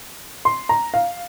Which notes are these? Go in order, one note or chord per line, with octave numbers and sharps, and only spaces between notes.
C6
A#5
F5